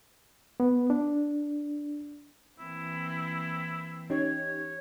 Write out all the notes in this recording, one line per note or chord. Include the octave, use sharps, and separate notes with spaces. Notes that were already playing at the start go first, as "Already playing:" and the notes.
B3
D4
E3 A#3 C4 E4
C#4 D#4 G4 C#5